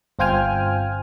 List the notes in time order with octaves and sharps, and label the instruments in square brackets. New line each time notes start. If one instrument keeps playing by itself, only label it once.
[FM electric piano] G1 C4 F4 G5 G#5 F6